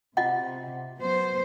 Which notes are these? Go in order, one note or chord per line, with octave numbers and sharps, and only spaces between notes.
C3 F4 D#5 F#5
F#3 B3 C5